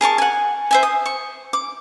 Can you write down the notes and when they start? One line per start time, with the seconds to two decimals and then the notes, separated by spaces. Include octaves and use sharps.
0.01 G#4 A#4 A5 C#6
0.18 F#5 G#5
0.71 C5 E5 G#5
0.83 D#6
1.06 C#6
1.53 D6